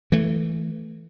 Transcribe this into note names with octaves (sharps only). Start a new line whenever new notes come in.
E3 A3